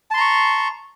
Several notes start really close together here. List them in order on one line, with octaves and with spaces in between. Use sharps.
A5 C6 A#5 C#6